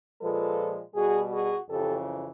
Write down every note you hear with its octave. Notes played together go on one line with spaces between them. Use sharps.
A#2 F3 G#3 A4 B4
B2 G3 F#4 G#4
F#4 G#4
F2 C#3 E3 G4 A4